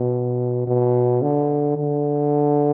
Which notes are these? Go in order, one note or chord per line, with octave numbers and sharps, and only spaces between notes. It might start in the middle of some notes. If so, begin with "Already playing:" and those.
Already playing: B2
B2
D3
D3